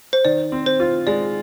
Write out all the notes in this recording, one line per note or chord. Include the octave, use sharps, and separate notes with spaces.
C5
D#3 D5
C4
C5
F4
G#3 D5